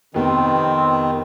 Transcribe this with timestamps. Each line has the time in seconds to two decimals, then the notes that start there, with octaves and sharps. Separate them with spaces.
0.14 F2 C3 D#3 B3 C4